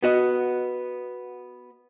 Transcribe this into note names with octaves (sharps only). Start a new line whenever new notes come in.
B3 F#4 D#5